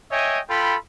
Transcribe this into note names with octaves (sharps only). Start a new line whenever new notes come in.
C#5 D#5 E5 G5 G#5
F4 A4 G5 B5